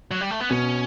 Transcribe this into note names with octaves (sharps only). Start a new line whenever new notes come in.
F#3
G3
A3
B3
B2 C#4